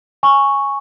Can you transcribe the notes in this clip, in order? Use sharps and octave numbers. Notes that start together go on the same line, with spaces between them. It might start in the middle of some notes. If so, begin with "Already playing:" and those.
G#5 C#6